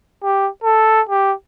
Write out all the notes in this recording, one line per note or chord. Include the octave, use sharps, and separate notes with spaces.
G4
A4
G4